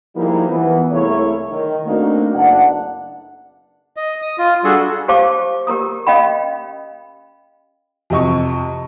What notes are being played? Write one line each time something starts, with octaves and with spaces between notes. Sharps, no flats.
F3 G3 G#3 A#3 D#4 E4
E3 B3
C2 A3 A#3 E4 G#4 C#5
D#3
A3 A#3 C4 D4 D#4 F#4
F#1 B1 D4 F#5
D#5
D#6
F4
G3 D4 F#4 G#4 A4
G4 C5 F5 A5 D6
G4 A#4 A#5 D#6
C#4 D#5 F5 G5 B5
F2 C3 D#5 C#6